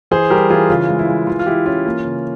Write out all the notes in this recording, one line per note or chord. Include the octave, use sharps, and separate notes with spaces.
E3 G#4 C5
G3 G4 A#4
E3 F4 G#4
C#3 F4
G#3
E4
G#3
E3 F4
F4
E3 E4 G4
C#4 F4
A#3
C#3